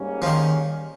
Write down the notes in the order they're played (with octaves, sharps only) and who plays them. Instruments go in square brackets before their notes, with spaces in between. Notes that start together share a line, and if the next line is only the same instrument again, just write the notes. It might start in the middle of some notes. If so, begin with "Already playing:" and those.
Already playing: [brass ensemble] G#2 G3 A#3 C#4 G4
[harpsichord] F3
D#3